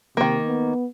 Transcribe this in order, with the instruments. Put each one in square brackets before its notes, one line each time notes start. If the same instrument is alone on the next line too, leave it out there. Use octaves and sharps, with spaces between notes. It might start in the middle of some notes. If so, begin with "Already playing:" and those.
[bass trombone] C3 [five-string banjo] D#3 A#3
[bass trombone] B3